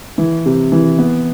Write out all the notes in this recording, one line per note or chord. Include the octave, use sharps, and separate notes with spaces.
E3
C3
E3
B3